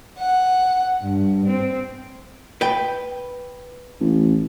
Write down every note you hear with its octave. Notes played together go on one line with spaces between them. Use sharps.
F#5
G2
C4
B4 G5
A1